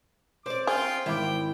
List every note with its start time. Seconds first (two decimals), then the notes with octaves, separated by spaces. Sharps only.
0.46 C4 C5 D5 D6
0.67 F4 G#4 G5 C6
1.06 G#1 E4 G5 D6